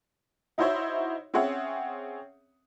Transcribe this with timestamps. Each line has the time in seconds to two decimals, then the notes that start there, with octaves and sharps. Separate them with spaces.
0.58 D#4 E4 F#4 C5 C#5 E5
1.34 C4 C#4 G#4 C#5 E5 F#5